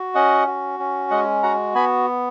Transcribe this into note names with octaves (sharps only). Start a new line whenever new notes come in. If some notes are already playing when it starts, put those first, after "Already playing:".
Already playing: F#4
C#4 D#5 F#5
F#4
C#4
G#3 D#5 F#5
F#4 F#5 A#5
B3 G#5 B5